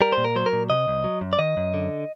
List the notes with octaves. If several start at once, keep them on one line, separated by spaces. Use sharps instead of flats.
G3 A#4
C5
A#2
A#4
F#3 C5
A#4
A#2
C3 D#5
C2
F#3
F#2
D5
D#3 D#5
F#2
D3